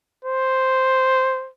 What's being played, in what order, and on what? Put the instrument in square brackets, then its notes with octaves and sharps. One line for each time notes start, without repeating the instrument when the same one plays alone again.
[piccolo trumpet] C5